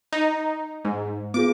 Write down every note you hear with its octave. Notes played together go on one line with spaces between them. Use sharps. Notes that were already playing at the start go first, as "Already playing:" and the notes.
D#4
G#2
B3 F4 G#4 D6